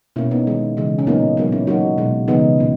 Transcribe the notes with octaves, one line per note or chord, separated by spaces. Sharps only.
B2 A#3 C#4 E4
B3 D#4
D#3 G#3
C#3 E3 G#3
C#4
A#2 F#3 A#3 B3 D#4
A#2 F#3 A#3 B3 D#4
C#4 E4
D#3 F#3 A#3 D#4 F#4
B2 G#3
C#3 E3 G#3 B3 D#4
A#2 G#3